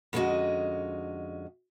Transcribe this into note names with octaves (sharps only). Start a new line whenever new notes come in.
F2 D3 G#3 C#4 F#4 D#5